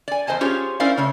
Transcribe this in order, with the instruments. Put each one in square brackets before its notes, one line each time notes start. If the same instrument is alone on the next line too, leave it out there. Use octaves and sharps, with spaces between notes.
[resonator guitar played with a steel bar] D5 G#5
E2 C5 D#5 G#5 A5
C#4 F4 G4 G#4 C5 C#5
C#4 E4 A#4 C5 D5 F5
C#3 A3 C#5